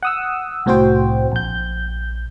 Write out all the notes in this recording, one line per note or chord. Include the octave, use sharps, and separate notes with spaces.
F#5 D#6 E6
C2 A2 C4 F#4 C5 G5
A#1 G6